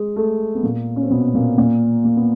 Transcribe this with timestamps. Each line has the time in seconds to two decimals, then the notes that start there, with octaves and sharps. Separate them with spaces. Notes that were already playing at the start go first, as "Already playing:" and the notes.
Already playing: G#3
0.16 A3
0.55 B3
0.63 A#2 A#3
0.96 C#4
1.03 C4
1.10 B2 B3
1.34 A#2 A#3
1.57 A#2 A#3
2.04 A#3
2.16 B3